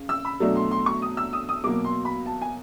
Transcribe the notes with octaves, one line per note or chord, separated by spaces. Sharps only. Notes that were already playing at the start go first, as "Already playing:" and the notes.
Already playing: C#3
E6
B5
B2 F#3 A3 D4
C6
C6
C#6
D#6
E6
D#6
D#6
B2 F#3 A#3 D6
C6
B5
A5
G#5